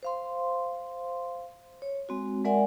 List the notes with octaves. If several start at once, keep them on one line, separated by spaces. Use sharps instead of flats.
C5 F5 C6
C#5
G#3 C4 F#4
G#3 A#4 D5 E5 F#5 G#5